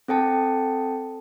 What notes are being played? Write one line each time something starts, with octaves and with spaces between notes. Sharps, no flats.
C4 A4 G5 A5